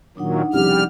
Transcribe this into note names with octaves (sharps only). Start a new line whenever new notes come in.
A#2 D#3 F#3 D4 D#4 F#5
C2 C#3 F3 G3 G4 F6